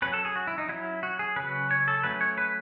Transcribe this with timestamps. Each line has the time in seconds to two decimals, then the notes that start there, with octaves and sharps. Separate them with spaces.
0.02 F#3 C#4 B4
0.13 A4
0.25 G#4
0.36 F#4
0.47 E4
0.58 D#4
0.69 F#3 C#4 E4
1.03 F#4
1.19 G#4
1.36 C#3 F#3 C#4 B4
1.71 C#5
1.88 A4
2.04 F#3 A3 C#4 B4
2.21 C#5
2.38 B4